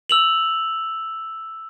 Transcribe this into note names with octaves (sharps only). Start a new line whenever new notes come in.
E6 F7 F#7